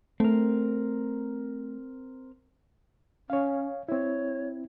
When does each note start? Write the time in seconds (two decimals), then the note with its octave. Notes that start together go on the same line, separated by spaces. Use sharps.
0.20 A3 C4 A#4
3.30 C#4 C#5 F5
3.89 C4 E4 C#5